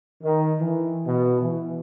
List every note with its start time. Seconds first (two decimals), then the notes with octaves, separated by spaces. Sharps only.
0.23 D#3
0.61 E3
1.07 B2
1.41 E3